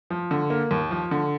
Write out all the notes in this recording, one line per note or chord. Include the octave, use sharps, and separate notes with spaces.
F3
D3
A#3
D#2
F3
D3